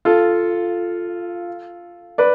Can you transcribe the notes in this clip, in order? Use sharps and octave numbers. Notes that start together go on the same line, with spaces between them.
F4 A4
B4 D5